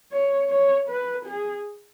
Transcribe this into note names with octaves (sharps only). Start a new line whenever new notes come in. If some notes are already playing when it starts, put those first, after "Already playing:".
C#5
C#5
B4
G#4